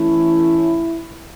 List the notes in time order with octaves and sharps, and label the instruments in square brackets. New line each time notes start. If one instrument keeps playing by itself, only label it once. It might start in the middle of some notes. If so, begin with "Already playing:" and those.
Already playing: [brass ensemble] E3 A3 C#4 E4